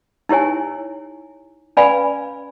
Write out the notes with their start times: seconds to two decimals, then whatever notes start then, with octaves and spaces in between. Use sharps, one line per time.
0.29 D#4 E4 G4 C#5 G#5
1.77 C#4 B4 D5 F5 G#5 B5